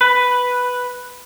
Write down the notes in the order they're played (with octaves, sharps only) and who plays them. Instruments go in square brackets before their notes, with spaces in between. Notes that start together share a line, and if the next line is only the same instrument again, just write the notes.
[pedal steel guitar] B4